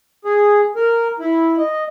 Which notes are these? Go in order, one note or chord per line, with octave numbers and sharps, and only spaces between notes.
G#4
A#4
E4
D#5